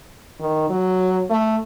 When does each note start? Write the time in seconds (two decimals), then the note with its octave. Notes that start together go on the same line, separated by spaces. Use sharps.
0.39 D#3
0.70 F#3
1.30 A3